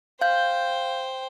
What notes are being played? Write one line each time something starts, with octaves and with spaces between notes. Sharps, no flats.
C5 F5 G5 G6